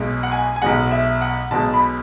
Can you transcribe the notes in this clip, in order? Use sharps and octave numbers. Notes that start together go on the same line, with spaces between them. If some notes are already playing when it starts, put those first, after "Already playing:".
Already playing: B1 B2 G#3
F#5
G#5
G#5
B1 B2 G#3 F#5
E5
F#5
B1 B2 G#3 A5
B5